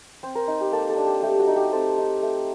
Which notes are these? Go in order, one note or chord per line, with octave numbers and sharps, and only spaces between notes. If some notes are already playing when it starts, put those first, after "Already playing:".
C4 C5
A#4
D#4
G4
A#3 A4
A4
D4
G4
A3 G4
F#4
D#4
G4
C4 A4
D#4
A3